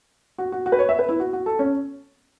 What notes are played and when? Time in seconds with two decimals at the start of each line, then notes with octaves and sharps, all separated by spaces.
0.38 F#4
0.52 F#4
0.66 F#4
0.72 B4
0.79 C#5
0.89 E5
0.99 B4
1.09 E4
1.20 F#4
1.33 F#4
1.46 A4
1.59 C#4